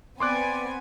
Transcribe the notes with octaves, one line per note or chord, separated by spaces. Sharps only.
B3 C4 D5 G#5 C6 D6 F#6